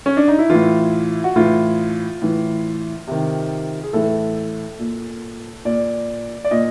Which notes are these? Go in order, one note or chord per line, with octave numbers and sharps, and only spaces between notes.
C#4
D4
D#4
E4
A2 E3 F4
F#4
A2 E3 F4
A2 E3
C3 D#3
G#4
A2 E3 A4
A#2
A#2 D5
D5
A#2 D#5